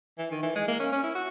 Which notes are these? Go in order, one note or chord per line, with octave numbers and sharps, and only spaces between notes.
E3
D#3
E3
G#3
A#3
C#4
C#4
E4
F#4